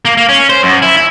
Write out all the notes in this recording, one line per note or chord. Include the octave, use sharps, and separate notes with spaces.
A#3
A#3
C#4
C5
F#2
E4
E4